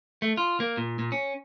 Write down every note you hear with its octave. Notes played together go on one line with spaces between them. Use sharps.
A3
F4
A#3
A#2
A#2
C#4